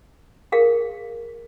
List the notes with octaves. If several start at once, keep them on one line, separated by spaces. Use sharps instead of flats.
G#4 A#4 F5